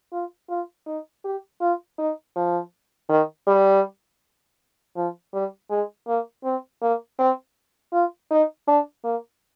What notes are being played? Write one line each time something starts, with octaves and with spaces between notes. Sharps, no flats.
F4
F4
D#4
G4
F4
D#4
F3
D#3
G3
F3
G3
G#3
A#3
C4
A#3
C4
F4
D#4
D4
A#3